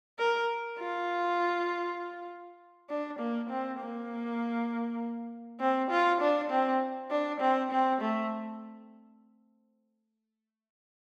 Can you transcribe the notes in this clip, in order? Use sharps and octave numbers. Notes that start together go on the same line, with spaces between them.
A#4
F4
D4
A#3
C4
A#3
C4
F4
D4
C4
D4
C4
C4
A3